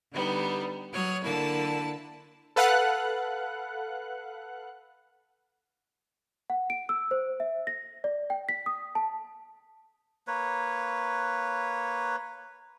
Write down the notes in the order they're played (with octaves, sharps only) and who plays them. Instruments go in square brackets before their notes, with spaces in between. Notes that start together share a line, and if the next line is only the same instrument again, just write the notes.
[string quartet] D3 G3 B3 D#4
F#3 C#5 D#6 F6
D3 A#3 E4 A5
[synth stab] A4 B4 F5 F#5 F#6
[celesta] F#5
D7
E6
C5
E5
A#6
D5
G5
B6
D#6
A5
[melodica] A#3 B4 C#5